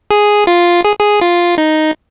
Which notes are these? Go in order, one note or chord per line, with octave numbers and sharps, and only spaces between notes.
G#4
F4
G#4
G#4
F4
D#4